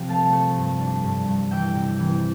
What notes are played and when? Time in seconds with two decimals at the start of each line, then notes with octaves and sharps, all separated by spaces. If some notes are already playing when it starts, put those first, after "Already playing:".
Already playing: C3 F3 C4
0.08 A3 F5 A5
0.33 A3
0.57 G2
0.80 D4
1.03 G2
1.28 G2
1.51 E3 E5 G5
1.75 C3
1.99 E3